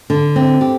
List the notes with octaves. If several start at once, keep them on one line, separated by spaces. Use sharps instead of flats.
D3
C4
G4